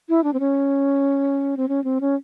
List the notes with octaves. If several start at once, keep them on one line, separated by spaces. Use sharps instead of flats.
E4
D4
C4
C#4
C4
C#4
C4
C#4